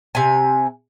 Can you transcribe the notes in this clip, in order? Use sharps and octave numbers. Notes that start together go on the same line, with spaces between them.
C3 G#5